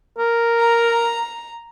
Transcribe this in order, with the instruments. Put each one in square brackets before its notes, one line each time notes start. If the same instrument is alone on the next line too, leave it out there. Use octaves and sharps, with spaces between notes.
[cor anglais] A#4
[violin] A#5